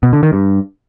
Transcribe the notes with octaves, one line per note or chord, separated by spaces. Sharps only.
B2
D3
D#3
G2